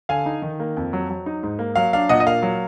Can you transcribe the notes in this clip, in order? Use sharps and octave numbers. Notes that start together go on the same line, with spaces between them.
D3 F5 G#5
D#4
D#3
A#3
F2
F#3
F#3
D#4
G#2
A#3
F#3 F5
D4 F5
A#2 D#5 F#5
D#5
A#3 F5
F#3